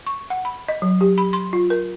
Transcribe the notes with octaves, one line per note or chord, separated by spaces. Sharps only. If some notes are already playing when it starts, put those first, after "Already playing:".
C#6
F#5
B5
D#5
F#3
G4
B5
C6
F4
A#4